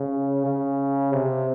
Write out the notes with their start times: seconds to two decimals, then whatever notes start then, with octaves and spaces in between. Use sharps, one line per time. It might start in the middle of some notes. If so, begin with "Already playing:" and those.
Already playing: C#3
0.45 C#3
1.12 C3